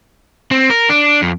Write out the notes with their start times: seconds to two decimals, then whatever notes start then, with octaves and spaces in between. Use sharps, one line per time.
0.51 C4
0.70 A#4
0.89 D4
1.22 F2